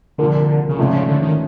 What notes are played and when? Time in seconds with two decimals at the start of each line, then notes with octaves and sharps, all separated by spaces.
0.18 C2 A#2 D3 F3 A#3
0.69 C#3
0.78 A#1 G#2 C3 F3 A3 C#4
0.93 C#3
1.08 D3
1.22 D#3